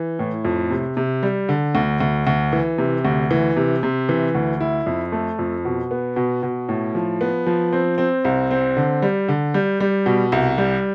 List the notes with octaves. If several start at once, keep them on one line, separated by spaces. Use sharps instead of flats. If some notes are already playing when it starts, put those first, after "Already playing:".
Already playing: E3
A2
F2
C3
C3
G3
D3
D2
D2
D2
E3
C3
D2
E3
C3
C3
E3
D2
E4
F2
A3
F2
B2
B3
B2
B2
A2
F3
B3
F3
C4
C4
C2
C4
D3
G3
D3
G3
G3
B2
C2
G3